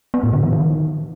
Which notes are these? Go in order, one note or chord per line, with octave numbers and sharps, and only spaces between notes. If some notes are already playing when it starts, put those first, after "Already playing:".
B3
A2
D3
E3
D#3